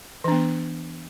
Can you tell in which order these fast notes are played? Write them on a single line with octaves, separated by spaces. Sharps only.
E3 D4 B3